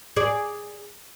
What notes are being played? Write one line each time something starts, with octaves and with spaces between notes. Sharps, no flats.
G#4 D5